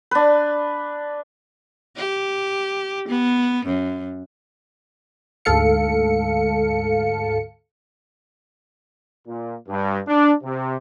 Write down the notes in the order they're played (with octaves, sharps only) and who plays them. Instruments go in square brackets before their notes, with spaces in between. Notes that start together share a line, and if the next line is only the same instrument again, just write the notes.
[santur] D4 B4
[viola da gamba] G4
B3
F#2
[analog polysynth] D2 G#2 A4 F5 C#7
[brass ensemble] A#2
G2
D4
C3